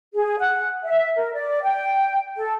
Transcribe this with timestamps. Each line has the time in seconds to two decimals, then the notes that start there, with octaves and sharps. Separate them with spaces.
0.14 G#4
0.38 F#5
0.84 E5
1.16 A#4
1.33 D5
1.63 G5
2.36 A4